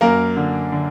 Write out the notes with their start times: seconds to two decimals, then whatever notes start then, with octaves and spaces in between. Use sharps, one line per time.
0.01 F#2 A#3 A#4
0.37 D3
0.72 D3